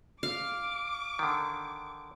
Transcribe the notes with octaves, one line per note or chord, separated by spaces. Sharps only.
F5 D6
D3 D#3